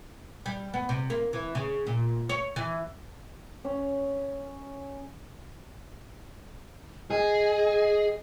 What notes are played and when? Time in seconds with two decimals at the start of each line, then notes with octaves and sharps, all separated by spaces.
0.46 G3
0.74 B3
0.89 C3
1.10 A#3
1.33 E3
1.55 C#3
1.87 A#2
2.29 C#5
2.56 E3
3.65 C#4
7.11 G#4 D#5